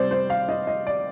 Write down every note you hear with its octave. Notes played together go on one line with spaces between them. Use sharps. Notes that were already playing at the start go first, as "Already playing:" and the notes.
Already playing: C3 G3 C4 C5 D5
C5
F5
D#5
D#5
D5